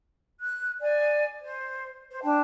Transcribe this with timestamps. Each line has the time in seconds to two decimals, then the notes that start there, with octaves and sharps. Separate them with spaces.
0.39 F#6
0.80 D5 G#5
1.41 C5
2.09 C5
2.22 D4 G5 A5